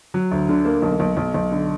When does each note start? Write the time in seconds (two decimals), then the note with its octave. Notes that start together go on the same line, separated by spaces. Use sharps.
0.14 F#3
0.31 D2
0.49 D3
0.65 A#3
0.82 B1
1.00 B1
1.17 B1
1.34 B1
1.52 D3